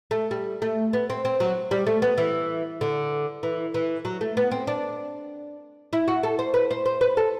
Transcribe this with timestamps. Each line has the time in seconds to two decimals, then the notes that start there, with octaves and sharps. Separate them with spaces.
0.11 A3
0.31 G3
0.62 A3
0.93 B3
1.10 C4
1.25 C4
1.40 F#3
1.71 G3
1.87 A3
2.02 B3
2.18 E3
2.81 D3
3.43 E3
3.74 E3
4.05 F#3
4.21 A3
4.37 B3
4.51 C4
4.67 D4
5.93 E4
6.08 F#4
6.23 A4
6.39 C5
6.54 B4
6.71 C5
6.86 C5
7.01 B4
7.17 A4